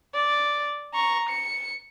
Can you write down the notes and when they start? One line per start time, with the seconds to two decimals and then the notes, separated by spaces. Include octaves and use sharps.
0.15 D5
0.94 A#5 C#6
1.29 C#7